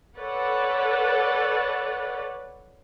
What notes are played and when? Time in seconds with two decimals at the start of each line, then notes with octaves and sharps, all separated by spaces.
0.16 A4 B4 C#5 D5 F#5